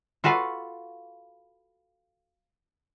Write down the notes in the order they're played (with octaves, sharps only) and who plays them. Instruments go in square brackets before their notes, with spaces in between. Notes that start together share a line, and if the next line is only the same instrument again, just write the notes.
[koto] F4 F#4 A4 B4 F5